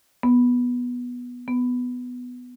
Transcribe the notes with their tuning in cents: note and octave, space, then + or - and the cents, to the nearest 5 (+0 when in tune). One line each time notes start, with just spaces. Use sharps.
B3 -10
B3 +5